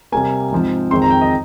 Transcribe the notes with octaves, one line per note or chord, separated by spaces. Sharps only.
C3 G3 A#3 G#5
G#2 F3 C4
F2 D#3 G#3 C4 C6
A#5
G5
D#5